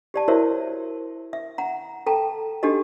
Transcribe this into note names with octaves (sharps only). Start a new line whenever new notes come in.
G4 D5 A5
E4 F#4 A#4 C5 C#5 E5
E5
F#5 A#5
A4 G5 A5 A#5
D4 D#4 F#4 G4 A4 D#5